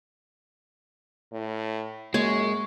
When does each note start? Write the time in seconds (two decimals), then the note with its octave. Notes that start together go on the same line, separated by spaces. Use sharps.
1.33 A2
2.14 F#2 G#3 A#3 C#5